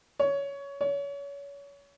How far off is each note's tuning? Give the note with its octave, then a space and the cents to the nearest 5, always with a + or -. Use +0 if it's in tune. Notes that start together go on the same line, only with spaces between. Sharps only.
C#5 +15
C#5 +30